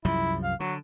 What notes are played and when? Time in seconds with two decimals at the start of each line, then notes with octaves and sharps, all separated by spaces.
0.05 C2 F#2 F3 E4
0.43 F5
0.60 D3 F#3